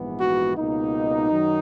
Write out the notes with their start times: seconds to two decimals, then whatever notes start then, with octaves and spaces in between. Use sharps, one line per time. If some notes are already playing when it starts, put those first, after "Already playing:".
Already playing: A#1 G#2 E3 B3
0.19 F#4
0.57 C#2 B2 A#3 D#4
1.31 F#2 D#3 F#3